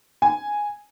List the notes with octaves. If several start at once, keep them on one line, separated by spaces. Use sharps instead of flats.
G#5